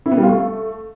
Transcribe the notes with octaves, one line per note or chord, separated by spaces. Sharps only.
E4
B3
G3
F4
A3